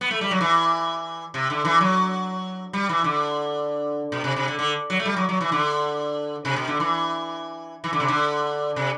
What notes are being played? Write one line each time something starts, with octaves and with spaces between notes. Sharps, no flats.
B3
A3
G3
F#3
E3
C3
D3
E3
F#3
G3
E3
D3
B2
C3
C3
D3
D3
F#3
A3
G3
F#3
F#3
E3
D3
C3
B2
D3
E3
E3
D3
C3
D3
C3